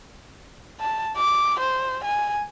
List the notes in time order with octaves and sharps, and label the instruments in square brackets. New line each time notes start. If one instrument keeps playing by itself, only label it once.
[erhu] A5
D6
C5
G#5